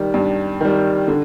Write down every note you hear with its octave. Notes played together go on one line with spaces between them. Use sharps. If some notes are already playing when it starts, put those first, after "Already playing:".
Already playing: D#3 G3
G2
D#3 G3
D3